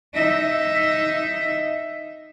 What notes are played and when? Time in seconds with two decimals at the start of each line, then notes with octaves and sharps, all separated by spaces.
0.14 D#4 E5